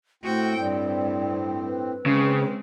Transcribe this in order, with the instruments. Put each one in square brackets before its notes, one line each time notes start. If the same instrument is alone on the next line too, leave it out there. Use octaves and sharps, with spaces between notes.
[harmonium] A2 C4 [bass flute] A3 [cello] F#4 G5
[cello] G2 [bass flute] D5
[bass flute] B4
[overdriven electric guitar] C#3 [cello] G#3 [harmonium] C4